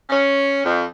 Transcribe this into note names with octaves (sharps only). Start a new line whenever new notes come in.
C#4
F2